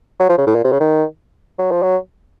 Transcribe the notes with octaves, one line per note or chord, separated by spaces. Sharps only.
F#3
F3
C#3
A2
A#2
C3
C#3
D#3
F#3
F3
F#3